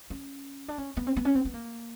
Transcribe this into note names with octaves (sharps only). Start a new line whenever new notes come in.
C#4
D4
C#4
B3
C4
B3
C#4
C4
B3
A#3